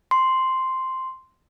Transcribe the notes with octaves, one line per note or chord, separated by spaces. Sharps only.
C6